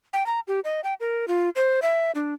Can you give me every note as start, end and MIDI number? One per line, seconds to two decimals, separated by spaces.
0.13 0.26 79
0.26 0.40 82
0.48 0.60 67
0.64 0.81 75
0.84 0.94 79
1.00 1.25 70
1.28 1.50 65
1.56 1.80 72
1.82 2.11 76
2.15 2.34 62